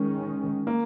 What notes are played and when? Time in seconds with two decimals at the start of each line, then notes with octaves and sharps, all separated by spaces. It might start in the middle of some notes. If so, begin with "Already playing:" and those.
Already playing: D#3 G#3 C#4
0.67 A#3